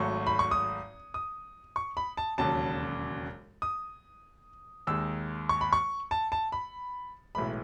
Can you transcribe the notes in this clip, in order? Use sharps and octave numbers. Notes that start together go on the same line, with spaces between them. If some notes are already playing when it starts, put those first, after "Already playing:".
Already playing: G#1 G#2 F#3 A3 C#6
B5
C#6
D#6
D#6
C#6
B5
A5
E1 D#2 C#3 F#3 A5
D#6
D#2 D#3 G#3 E6
C#6
B5
C#6
A5
A5
B5
B1 A2 E3 G#3 B5